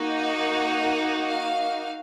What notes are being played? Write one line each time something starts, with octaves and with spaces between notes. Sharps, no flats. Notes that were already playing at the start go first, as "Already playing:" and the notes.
Already playing: A#3 D#4 F#4
F#5
F5